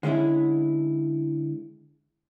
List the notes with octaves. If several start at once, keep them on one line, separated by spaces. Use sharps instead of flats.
D3 G#3 C#4 E4